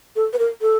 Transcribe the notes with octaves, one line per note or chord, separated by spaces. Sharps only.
A4
B4
A#4
A4